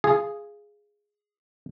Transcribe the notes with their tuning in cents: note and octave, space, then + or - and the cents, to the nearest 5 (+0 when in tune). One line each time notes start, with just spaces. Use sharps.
F4 -15 G#4 +0